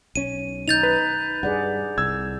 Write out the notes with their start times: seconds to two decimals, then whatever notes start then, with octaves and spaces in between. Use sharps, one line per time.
0.16 B1 C#4 D#7
0.68 D#4 G6 A6 F7
0.83 B4
1.43 G2 G#4 D5 F#5
1.98 C2 E6 G#6